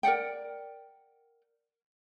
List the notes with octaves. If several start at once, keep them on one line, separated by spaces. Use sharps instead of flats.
A#4 D5 F#5 G5